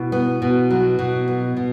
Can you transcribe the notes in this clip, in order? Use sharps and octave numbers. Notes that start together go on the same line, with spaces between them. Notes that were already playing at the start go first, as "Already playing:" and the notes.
Already playing: B2 E4
B3
B2
F#3
B2
B3
B2